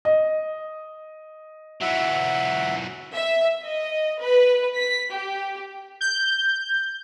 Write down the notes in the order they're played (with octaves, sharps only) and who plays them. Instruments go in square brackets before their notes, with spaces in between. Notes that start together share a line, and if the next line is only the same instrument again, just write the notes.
[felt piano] D#5
[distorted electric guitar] E3 F#3 [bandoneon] E5 F#5
[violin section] E5
D#5
B4
B6
G4
[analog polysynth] G6